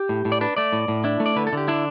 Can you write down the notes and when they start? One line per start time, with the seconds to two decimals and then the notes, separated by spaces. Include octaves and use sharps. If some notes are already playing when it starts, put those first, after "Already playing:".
Already playing: G4
0.09 A2
0.25 A2
0.32 D5
0.41 D4 B4
0.57 A3 D5
0.73 A2
0.88 A2
1.04 D4 E4
1.20 A3
1.26 D5
1.36 D3 B4
1.47 A4
1.53 D3 G4
1.68 D4 E4